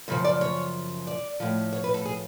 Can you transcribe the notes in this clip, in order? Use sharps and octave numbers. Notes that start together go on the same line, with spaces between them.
F#2 C#3 F3 C#5
D5
C#5
D5
A2 F3
C#5
B4
A4
G#4